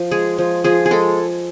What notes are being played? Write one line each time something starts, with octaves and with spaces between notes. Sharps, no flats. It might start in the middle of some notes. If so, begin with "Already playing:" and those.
Already playing: F3
G#3 G#4
F3
F3 G#4
G#4
G#3 A4